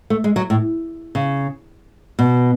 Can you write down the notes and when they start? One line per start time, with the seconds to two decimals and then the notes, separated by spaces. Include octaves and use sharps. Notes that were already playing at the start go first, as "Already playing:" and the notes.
0.10 A3
0.24 G#3
0.36 F#3
0.50 A2
1.15 C#3
2.19 B2